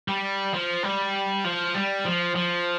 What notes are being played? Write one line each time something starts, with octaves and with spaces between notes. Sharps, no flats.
G3
F3
G3
F3
G3
F3
F3